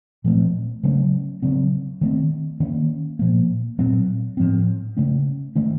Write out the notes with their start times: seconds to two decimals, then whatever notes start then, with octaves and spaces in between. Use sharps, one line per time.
0.24 A#2 F3 A3 C4
0.83 C#3 F#3 A3 C#4
1.42 C#3 F#3 C4
2.01 D#3 A3 C4
2.60 D#3 A#3 C#4
3.19 A#2 F3 A#3
3.79 A#2 F#3 C4
4.37 A2 F3 C4
4.97 C#3 A3 C#4
5.56 D#3 A3 C#4